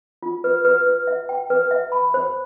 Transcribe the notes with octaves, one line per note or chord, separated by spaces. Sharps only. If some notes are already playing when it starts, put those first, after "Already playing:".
F4
B4
B4
B4
E5
G5
B4
E5
B5
C5